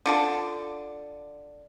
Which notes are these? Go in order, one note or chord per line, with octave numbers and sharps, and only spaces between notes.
D3 F4 A5